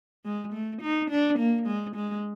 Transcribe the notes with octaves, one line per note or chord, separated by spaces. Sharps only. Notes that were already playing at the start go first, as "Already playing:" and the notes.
G#3
A3
D#4
D4
A#3
G#3
G#3